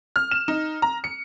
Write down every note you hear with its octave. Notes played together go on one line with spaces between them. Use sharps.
F6
E7
D#4
A#5
C#7